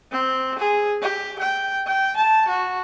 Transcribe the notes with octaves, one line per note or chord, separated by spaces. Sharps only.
C4
G#4
G4
G5
G5
A5
F#4